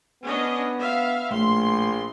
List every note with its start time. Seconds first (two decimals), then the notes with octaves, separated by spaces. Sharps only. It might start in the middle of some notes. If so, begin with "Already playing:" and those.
0.23 B3 C#4 D4 D#5
0.78 E5 F5
1.31 A#1 A2 C6